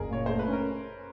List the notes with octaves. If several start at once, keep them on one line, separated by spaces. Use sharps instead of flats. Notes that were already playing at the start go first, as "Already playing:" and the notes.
Already playing: F#1 G#4 A#4
A#2 C#5
A3 C5
B4
C#4
A#4